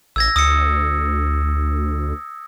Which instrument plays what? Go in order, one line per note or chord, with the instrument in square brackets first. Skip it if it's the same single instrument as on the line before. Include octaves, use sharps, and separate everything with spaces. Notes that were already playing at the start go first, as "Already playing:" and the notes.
[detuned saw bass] A1 [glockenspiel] E6 G#6 A#6
[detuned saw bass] D2 [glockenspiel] D#6 E6 C#7